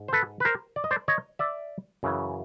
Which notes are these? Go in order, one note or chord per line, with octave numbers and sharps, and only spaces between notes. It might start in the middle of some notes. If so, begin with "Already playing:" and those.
Already playing: G#2
C5
A4 B4
B4
A#4 C5
D5
D#5
C5 D5
C#5 D#5
D5 E5
F#2 C#3 E3